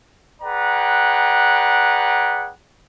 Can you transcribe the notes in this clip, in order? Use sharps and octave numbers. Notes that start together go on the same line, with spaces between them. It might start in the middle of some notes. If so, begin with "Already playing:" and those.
G#4 B4 D5 F#5 G5 A#5